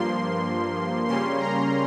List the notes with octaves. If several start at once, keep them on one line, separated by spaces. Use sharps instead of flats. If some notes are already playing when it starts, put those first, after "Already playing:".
Already playing: G2 F3 A#3 C6
C#3 G3 A#3 C#4 C6
A#5